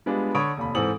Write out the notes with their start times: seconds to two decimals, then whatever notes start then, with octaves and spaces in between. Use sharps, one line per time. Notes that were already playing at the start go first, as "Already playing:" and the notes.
0.06 G3 G#3 B3 D4 F4
0.35 D3 C#5 B5 D#6 D7
0.57 F1 D#2 B5
0.75 G#2 E3 C4 A4 D#6 F#7